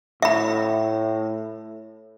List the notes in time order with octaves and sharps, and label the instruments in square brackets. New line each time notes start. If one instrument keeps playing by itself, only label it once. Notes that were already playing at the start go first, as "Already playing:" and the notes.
[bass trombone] A2 [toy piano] E5 B5